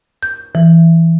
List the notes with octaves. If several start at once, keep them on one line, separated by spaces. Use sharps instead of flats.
G6
E3